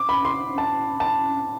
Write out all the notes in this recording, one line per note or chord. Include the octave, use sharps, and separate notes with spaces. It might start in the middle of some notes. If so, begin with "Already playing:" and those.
Already playing: D6
B5
C6
A5
A5